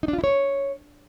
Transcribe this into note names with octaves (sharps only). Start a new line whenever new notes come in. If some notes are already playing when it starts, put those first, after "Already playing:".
D#4
D4
F4
E4
C#5